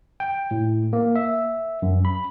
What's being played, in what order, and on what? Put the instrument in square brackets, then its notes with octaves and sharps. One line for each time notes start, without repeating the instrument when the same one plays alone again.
[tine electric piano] G5
A2
A#3
E5
F#2
B5